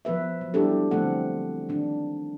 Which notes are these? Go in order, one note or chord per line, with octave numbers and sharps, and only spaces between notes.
F3 B3 B4 E5
F#3
G3 B3 D4 E4 G4 A4
D3 F3 A3 C4 A4 F#5
D#3 D4